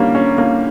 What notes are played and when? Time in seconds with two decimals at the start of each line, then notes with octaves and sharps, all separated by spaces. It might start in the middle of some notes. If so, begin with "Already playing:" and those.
Already playing: D3 G3 A#3 C#4
0.15 C#4
0.38 A#3